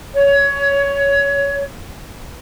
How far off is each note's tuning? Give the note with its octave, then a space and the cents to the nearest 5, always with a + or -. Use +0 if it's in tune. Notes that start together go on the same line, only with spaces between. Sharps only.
C#5 +20